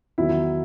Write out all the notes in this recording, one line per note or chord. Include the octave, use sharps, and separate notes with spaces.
E2 D#3 F#3 E4